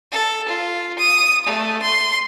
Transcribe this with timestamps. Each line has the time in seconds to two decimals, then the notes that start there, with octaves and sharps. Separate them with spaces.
0.12 A4
0.48 F4
0.98 D#6
1.46 A3
1.82 C6